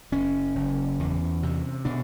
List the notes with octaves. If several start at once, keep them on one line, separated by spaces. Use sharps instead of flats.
F#1 C#4
F#1
E2
C3
B2 D4